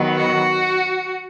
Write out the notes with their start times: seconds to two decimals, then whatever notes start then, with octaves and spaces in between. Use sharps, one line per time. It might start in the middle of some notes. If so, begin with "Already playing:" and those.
Already playing: D#3 F#3 B3
0.17 F#4